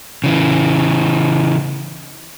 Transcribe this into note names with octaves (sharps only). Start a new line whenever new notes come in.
C#3 E3